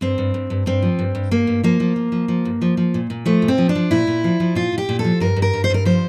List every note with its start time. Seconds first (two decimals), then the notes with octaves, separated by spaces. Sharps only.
0.01 G2 C4
0.18 G2
0.34 G2
0.50 G2
0.66 G2 C4
0.82 F3
0.99 G2
1.15 G2
1.31 G2 A#3
1.47 G2
1.64 F3 A#3
1.80 F3
1.96 F3
2.12 F3
2.28 F3
2.45 G2
2.62 F3
2.77 F3
2.94 A#2
3.10 A#2
3.26 F3 A3
3.42 A#2
3.48 C4
3.58 F3
3.69 D4
3.75 F3
3.91 A#2 E4
4.07 A#2
4.24 F3
4.40 F3
4.55 A#2 F4
4.72 A#2
4.78 G4
4.89 A#2
4.99 A4
5.04 F3
5.20 G2 A#4
5.36 G2
5.42 A#4
5.53 G2
5.64 C5
5.70 G2 A#4
5.85 F3 C5